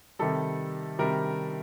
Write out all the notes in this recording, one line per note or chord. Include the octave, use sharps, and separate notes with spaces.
C3 D#3 G3 A4
C3 D#3 G3 A#4